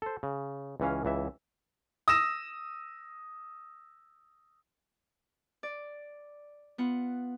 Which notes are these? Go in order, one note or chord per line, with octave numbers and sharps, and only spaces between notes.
A4 C5
C#3
C#2 E3 C#4 F5
C#2 E3 E5
D#6 E6 A#6 E7
D5
B3 F4 F#5